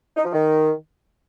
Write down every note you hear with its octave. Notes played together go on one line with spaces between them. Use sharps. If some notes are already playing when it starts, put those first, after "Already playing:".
D#4
F3
D#3